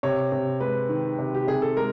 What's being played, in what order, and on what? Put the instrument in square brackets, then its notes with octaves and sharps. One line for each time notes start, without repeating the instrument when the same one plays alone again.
[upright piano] C3 [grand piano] C#5
[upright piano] C3
[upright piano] G#3 [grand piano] B4
[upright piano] D#3
C3
[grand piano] G4
[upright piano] C3 [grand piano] G#4
[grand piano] A4
[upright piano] G#3 [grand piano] A#4